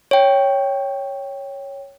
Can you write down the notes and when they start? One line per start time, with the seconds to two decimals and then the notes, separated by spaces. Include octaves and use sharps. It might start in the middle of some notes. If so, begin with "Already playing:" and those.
0.11 C#5 G5